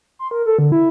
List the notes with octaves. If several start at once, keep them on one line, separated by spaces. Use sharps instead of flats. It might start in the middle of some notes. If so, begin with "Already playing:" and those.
C6
A#4
A4
D3
E4